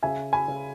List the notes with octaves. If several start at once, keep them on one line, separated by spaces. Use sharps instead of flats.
C#3 E5 G#5
G#5 B5
C#3